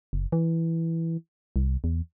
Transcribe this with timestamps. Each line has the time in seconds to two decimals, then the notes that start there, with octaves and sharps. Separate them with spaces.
0.13 F#1
0.32 E3
1.56 C2
1.84 E2